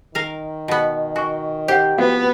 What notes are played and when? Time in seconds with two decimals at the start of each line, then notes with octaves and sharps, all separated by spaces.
0.15 D#3 A#4 F5
0.68 B2 B3
1.16 F#4 G#5 C#6
1.68 G4 C5 F#5
1.98 F3 B3 F#4 F5